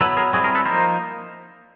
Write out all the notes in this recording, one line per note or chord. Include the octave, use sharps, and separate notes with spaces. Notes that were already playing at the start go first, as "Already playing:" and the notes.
F#3 B3 E4 A4 B4
G#4 A#4
G3 C4 E4 F#4 G#4
G#4 A#4
A4 B4
F3 A#3 D#4 A#4 C5